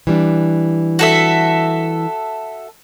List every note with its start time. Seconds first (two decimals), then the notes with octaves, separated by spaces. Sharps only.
0.07 E3 G3 D4
0.99 F#4 A4 E5